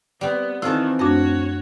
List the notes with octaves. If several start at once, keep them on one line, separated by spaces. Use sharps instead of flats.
G3 B3 C4
D#3 E3 C4 E4 F4 A4 F6
F#2 A3 D4 F#4 C#5 D#5